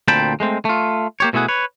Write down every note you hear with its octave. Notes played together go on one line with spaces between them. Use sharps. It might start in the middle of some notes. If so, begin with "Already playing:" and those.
D2 A#2 C4 G5 A5 B5
G#3 A3 C4
A3 F4
A#3 G4 C#5
B2 A3 E4 G#4 F#5
B4 C#5